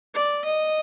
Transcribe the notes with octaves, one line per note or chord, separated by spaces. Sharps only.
D5
D#5